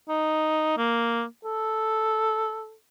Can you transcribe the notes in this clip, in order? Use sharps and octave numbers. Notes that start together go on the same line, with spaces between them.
D#4
A#3
A4